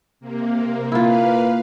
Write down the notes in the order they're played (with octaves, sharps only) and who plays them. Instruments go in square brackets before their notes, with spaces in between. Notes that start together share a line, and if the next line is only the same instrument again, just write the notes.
[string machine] C3 A#3
[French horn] A#3 [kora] E4 F4 [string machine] B4 F5